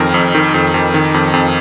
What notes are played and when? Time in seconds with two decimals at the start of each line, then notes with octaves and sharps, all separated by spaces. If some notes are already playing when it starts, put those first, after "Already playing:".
Already playing: F2 D#3 A#4
0.14 F2
0.35 D#3
0.54 F2
0.74 F2
0.94 D#3
1.14 F2
1.34 F2